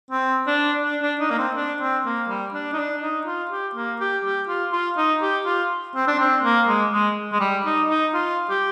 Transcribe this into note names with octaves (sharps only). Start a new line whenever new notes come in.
C4
D4
D4
D4
D#4
A#3
C4
D4
C4
A#3
G3
D4
D#4
D4
D#4
F4
G4
A#3
G4
G4
F4
F4
D#4
G4
F4
C4
D4
C4
A#3
G#3
G#3
G#3
G3
D#4
D#4
F4
G4